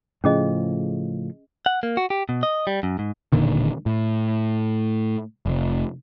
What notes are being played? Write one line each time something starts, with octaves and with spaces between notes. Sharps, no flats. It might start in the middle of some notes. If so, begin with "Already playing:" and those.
A2 C#3 F3 C#4 G#4 D#5
F#5
A#3
F#4
G4
B2
D#5
G3
F#2
G#2
E1 A#2 D3 D#3
A2
F1